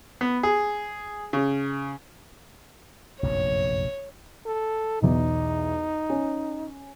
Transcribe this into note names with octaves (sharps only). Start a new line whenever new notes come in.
B3
G#4
C#3
F1 A#1 F#2 C#5
A4
B1 E2 D#4
C#4